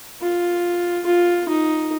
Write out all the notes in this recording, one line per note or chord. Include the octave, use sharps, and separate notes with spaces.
F4
F4
D#4